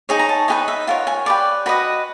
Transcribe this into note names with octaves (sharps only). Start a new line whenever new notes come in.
D#4 G#4 C#5 G#5
A#5
A5
D#4 G4 B4 D#5 G#5
E5
F4 A#4 C#5 F#5
G#5
G4 B4 D5
F#4 B4 D#5 B5